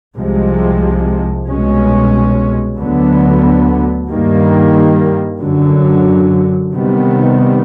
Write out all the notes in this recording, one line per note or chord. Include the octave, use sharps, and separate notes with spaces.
C2 C3 F3 G#3
C2 B2 G#3 C#4
D2 D3 F#3 B3
G2 D#3 G3 A#3
F#2 D3 F#3
C3 D#3 G3 B3